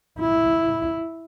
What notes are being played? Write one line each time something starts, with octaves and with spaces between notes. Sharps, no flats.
E4